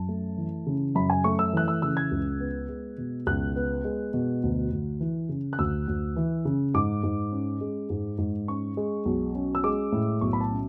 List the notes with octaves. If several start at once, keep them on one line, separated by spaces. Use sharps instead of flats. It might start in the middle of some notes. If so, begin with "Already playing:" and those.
Already playing: F#2 A5
A3
E3
C#3
F#2 B5
G#5
A3 C#6
E6
E3 F#6
E6
C#3 E6
G#6
C#2
B3
G#3
B2
C#2 F#6
B3
G#3
B2
D2
D2
E3
C#3
F#6
D2 E6
D2
E3
C#3
G#2 D6
G#2
C#4
G#3
G#2
G#2
C#4 C#6
G#3
B1
C#4
E6
G#3 D6
A2
B1 C#6
B5
A5
C#4